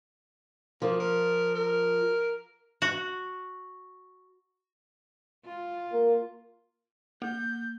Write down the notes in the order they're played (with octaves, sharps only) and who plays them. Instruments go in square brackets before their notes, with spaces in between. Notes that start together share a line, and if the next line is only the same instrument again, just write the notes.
[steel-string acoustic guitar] F3 [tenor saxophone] A#3
[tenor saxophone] A#4
A#4
[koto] F#4
[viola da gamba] F4
[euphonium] A#3
[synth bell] A#3 [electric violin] G6